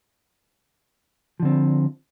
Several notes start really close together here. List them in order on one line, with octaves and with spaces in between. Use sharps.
F3 D3 C4